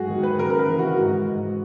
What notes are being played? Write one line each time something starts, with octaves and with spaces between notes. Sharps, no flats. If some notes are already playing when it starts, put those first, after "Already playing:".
Already playing: G#2 F#3 F#4 G#4
D#3
B4
C#3 A#4
A#4
B4
E3
F#4
G#2 F#4
G#2